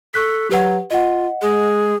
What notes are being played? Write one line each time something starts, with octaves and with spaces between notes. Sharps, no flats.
A4 C#6 F#6 B6
F#3 G4 B4 F#5
F4 D#5 F#5
G#3 G#4